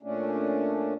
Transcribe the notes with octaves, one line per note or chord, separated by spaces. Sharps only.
A#2 A3 C#4 D4